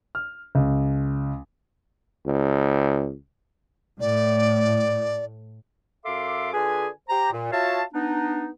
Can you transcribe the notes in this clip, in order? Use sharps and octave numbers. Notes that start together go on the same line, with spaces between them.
F6
C#2
C#2
A2 D5
F#2 A4 E5 F5 C6 D6
D3 F4 G#4 B4 G#5
G4 C5 A#5
A#2
F4 F#4 C#5 E5 F5 A5
B3 D4 D#4